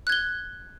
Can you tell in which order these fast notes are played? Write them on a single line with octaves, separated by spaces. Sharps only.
F#6 G#6 G7